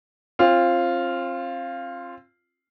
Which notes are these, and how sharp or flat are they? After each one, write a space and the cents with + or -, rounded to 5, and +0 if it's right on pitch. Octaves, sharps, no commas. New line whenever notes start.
C4 +35 F4 -5